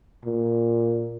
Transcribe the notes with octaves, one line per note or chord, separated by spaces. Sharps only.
A#2